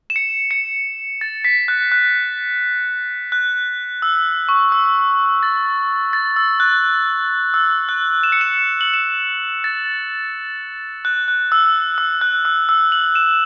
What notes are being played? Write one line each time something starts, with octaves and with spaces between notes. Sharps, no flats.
E7
C#7
C#7
A6
B6
F#6
F#6
F#6
E6
C#6
E6
A6
A6
E6
F#6
E6
F#6
E7
C#7
E7
F#7
E7
A6
F#6
F#6
E6
E6
F#6
E6
E6
F#7
E7